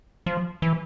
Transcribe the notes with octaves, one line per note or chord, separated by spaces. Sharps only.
F3
E3